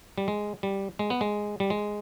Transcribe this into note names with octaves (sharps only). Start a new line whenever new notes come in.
G3
G#3
G3
G#3
B3
G#3
G3
G#3